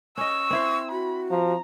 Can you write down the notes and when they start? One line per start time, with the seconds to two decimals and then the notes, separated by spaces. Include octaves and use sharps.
0.18 C#4 D#5 C#6 E6
0.51 C4 E4 C5
0.91 F#4 B5
1.31 F3 A#5